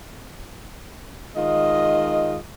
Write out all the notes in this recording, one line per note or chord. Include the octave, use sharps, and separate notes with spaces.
D#3 G#3 F4 D#5